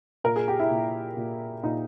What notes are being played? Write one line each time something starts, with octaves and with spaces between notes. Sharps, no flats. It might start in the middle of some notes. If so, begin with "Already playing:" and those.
A#2 A#4
G#4
G4
E4
A#2
A#2
A#2 D#4